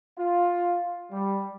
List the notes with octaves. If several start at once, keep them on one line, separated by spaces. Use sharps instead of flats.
F4
G3